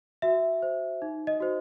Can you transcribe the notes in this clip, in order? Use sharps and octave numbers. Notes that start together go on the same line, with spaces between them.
F#4 E5
C5
D#4
D#5
F#4 C5